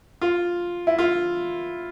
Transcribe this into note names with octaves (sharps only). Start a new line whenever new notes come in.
F4
E4
F4